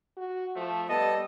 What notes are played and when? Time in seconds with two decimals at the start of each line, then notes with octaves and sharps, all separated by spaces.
0.17 F#4
0.56 F3 A3
0.89 G3 B3 A4 D#5 A5